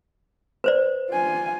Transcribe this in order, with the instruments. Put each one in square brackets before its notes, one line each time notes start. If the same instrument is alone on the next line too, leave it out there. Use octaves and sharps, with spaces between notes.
[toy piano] B4 C5 D5
[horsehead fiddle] F4 G#5